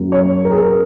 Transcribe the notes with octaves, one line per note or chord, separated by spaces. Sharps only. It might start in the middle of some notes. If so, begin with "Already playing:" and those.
Already playing: F#2 C#3 F#3 A#3
C#5
A#4
G#4
A#4